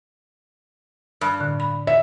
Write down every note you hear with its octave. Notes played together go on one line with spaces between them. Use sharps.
G2
A2 D3
B5
C#5 E5